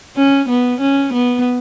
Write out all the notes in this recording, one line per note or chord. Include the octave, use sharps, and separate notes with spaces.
C#4
B3
C#4
B3